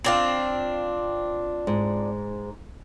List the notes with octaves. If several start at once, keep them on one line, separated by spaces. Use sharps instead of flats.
C4 D4 F4
G#2